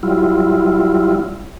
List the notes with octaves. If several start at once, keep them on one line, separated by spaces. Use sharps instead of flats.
F#3 G3 E4 F4